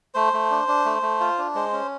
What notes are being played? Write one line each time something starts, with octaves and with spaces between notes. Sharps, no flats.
A3 C5
A3
D4
D4
A3
A3
F4
D4
G#3 C5
C#4